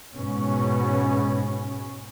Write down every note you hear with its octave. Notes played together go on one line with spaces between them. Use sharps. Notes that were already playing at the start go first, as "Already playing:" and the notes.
G#2 B2 C#4